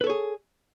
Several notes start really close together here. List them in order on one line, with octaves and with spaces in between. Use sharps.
B4 A4 C#5 G#4